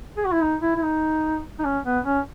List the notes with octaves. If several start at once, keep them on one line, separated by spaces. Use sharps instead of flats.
G#4
F#4
E4
D#4
E4
E4
D#4
D#4
C#4
B3
C#4